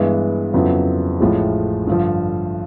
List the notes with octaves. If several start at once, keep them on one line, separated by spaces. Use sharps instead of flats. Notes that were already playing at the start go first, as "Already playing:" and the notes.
Already playing: G2 E3 G#3 B3
F2 C#3 F#3 B3 E4
A1 A2 F3 G#3
G2 D3 F3